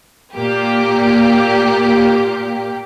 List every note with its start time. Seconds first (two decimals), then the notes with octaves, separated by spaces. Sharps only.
0.35 A#2 A#3 G4